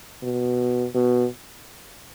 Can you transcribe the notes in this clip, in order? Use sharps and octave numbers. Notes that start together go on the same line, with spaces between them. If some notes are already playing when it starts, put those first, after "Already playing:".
B2
B2